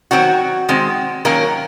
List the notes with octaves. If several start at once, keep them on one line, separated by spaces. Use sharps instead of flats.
D#3 F#3 C4 F#4
D#3 G#3 C4
D#3 F#3 A#3 C#4 A#4